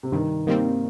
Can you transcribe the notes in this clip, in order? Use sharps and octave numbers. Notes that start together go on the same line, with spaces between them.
C3
G2 D#3
D#3 G3 A#3 C4